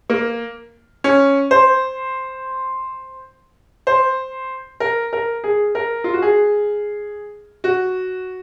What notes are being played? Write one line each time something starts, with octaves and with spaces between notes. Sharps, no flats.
A#3
C#4
C5
C5
A#4
A#4
G#4
A#4
F4
F#4
G#4
F#4